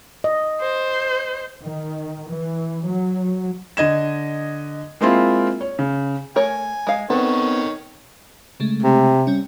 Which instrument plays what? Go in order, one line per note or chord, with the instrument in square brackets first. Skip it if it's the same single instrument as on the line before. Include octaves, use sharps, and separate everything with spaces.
[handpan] D#5
[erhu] C5
[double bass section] D#3
E3
F#3
[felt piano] D3 D#5 G#6 E7
G#3 A#3 C4 E4 F4
C#5
C#3
[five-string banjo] A3 A#4 C#5 [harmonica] G#5
[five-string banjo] G#3 F5
[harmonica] D#3 C#5 [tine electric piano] B3 C4 [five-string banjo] A4
[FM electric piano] C#3 G#3 A3
[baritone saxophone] C3
[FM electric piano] G3 C#4